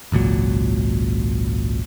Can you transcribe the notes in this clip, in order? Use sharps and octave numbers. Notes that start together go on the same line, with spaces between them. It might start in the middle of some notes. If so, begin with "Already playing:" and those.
G#1 C#2 A#2 F#3